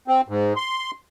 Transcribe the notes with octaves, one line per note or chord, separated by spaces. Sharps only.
C4
G#2
C6